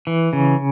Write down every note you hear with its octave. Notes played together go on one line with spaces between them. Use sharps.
E3
C#3